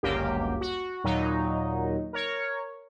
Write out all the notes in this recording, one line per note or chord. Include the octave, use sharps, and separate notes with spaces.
G1 C#2 F#2 A#3 G4
F#4
D#2 A#2 F#3 D#4
A#4 C#5